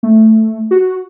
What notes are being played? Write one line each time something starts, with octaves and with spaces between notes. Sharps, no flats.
A3
F#4